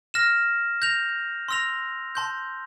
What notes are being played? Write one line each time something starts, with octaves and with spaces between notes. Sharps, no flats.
F6 A#6 E7
G6 A#6 F7
C6 E6 A#6 F7
A5 C6 G6